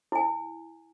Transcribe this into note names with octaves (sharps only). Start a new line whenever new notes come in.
E4 G#5